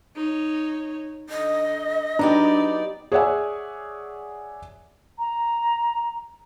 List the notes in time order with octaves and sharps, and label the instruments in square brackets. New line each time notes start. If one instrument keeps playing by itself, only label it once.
[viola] D#4 C#5
[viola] D3 [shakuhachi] D#5
[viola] F#3 D5 [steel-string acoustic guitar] B3 D#4 G4 [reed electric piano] D4 A#5
[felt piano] G#4 C#5 D5 E5 F#5 G#5
[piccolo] A#5